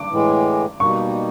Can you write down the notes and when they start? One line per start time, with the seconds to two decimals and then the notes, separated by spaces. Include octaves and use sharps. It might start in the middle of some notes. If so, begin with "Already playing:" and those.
Already playing: D6
0.10 A2 E3 G#3
0.80 B2 G3 A#3 D#4 C#6